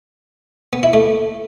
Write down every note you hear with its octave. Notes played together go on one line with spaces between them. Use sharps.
B3
E4
A3